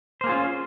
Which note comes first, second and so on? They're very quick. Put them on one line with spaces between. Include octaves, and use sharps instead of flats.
C5 A#3 G#4 F4 C#4